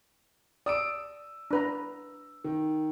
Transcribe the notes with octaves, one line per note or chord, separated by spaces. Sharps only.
D5 D#6 E6 D7
D4 B4 A#5
D#3